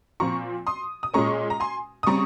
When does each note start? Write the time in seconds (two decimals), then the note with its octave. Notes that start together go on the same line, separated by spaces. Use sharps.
0.20 A#2 F3 C4 A#5 C#6
0.67 C6 D#6
1.03 D#6
1.14 A#2 G#3 C#4 A#5 C#6
1.50 A#5
1.60 G#5 C6
2.03 D#6
2.07 C#3 G3 C4 A#5 C#6